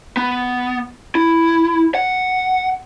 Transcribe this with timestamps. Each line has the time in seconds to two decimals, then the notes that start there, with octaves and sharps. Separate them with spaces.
0.17 B3
1.15 E4
1.95 F#5